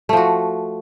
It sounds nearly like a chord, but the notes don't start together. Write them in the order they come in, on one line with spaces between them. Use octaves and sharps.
A3 F3 F#4